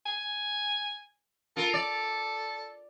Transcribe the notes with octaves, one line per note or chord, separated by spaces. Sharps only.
G#5
F4 A4 A#4
D5